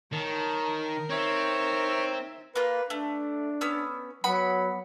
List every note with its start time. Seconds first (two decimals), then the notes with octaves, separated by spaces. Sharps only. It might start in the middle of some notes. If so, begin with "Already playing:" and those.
0.13 D#3 A#4 C#5 A5
1.10 C4 D#4 C#5 E5
2.56 A#3 F4 B4
2.90 A3 D4
3.61 B3 C#4 E6
4.24 F#3 B3 F#5 B5